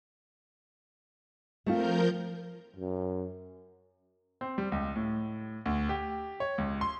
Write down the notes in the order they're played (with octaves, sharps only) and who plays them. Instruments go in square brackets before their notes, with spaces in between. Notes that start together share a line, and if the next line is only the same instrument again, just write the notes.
[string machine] F3 A#4 G6 [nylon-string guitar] A3 C4 F4
[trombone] F#2
[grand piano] C4
G3
C#2
A2
D2
G4
C#5
C#2
C6